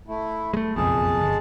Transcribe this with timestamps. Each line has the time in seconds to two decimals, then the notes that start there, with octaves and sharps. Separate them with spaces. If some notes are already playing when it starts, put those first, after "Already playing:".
0.08 A3 E4
0.53 G#3 A3
0.76 F#1 B1 F2 G#3 G#4 A5
1.20 G1